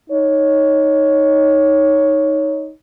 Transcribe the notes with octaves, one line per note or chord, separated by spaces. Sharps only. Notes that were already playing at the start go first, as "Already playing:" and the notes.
D#4 C#5